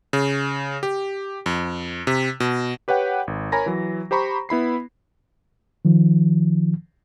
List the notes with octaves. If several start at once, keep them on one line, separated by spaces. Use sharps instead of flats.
C#3
G4
F2
C3
B2
G4 B4 C#5 F#5 G5
G#1
A#4 C#5 G#5 A#5 B5 A#6
E3 F#3
G4 C5 A#5 B5 C#6
B3 E4 B5 C7
D#3 F3